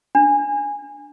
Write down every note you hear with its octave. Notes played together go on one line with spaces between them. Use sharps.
D4